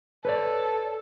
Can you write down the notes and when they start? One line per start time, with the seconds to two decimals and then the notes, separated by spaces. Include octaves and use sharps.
0.25 A4 B4 C#5 D5